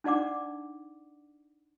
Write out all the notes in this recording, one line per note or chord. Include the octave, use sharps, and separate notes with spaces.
D4 D#4 D5 F#5 D6